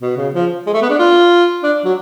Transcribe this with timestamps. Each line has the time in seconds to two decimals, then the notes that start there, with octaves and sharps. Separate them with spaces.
0.01 B2
0.17 C#3
0.34 F3
0.67 G#3
0.74 A3
0.82 B3
0.90 D4
0.99 F4
1.63 D4
1.85 F#3